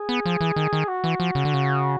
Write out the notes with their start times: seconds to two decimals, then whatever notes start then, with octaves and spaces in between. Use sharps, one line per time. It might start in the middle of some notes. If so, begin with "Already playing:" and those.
Already playing: G#4
0.09 B3
0.26 F3
0.41 E3
0.56 D#3
0.73 D#3
0.88 F#4
1.04 E3
1.20 F3
1.35 C#3
1.45 D3
1.54 C#3